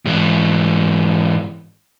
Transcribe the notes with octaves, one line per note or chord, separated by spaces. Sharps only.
G#2 E3